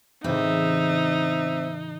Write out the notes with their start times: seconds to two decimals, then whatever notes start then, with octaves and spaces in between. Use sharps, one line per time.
0.24 A2 C#3 E3 C4 D#4 E5